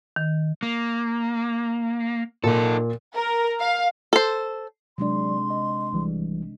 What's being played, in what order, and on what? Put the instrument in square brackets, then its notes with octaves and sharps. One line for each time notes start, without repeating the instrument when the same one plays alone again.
[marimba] D#3
[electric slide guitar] A#3
[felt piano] A#2 [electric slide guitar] D#4 A4
[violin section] A#4
F5
[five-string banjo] A4 C5
[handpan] C3 G#3 D4 [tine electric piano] F#3 D5 [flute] C6
[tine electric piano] D#5
B1 E3 G3